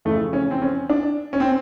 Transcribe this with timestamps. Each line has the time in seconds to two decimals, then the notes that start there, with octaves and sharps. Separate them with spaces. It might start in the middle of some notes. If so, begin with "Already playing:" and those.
0.05 F2 C#3 E3 A3
0.33 C#4
0.51 C4
0.62 C#4
0.89 D4
1.33 C#4
1.40 C4